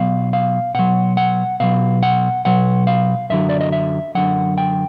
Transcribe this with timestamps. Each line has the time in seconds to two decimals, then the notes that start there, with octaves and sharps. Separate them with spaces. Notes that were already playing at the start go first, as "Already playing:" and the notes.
Already playing: B2 F#3 F5
0.33 F5
0.74 B2 F#3 F#5
1.17 F#5
1.60 B2 F#3 F5
2.03 F#5
2.45 B2 F#3 F#5
2.87 F5
3.30 F#2 D3 F#3 E5
3.49 D5
3.61 D#5
3.72 E5
4.15 F#2 D3 F#3 F#5
4.58 G5